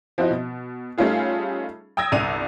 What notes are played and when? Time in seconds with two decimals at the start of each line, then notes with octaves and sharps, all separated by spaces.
0.18 F3 C4 E4 F#4 D#5
0.31 B2
0.98 G3 A3 C#4 D#4 F4 G#4
1.97 G5 D#6 E6 G#6 A#6
2.12 G1 C2 D5 D#7 F7